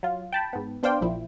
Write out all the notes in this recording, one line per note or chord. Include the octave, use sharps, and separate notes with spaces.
F#3 F4
G5 A5 B5
G#2 B3
B3 D4 C5 D5 F5 G5
A#1 A#2 F3 E4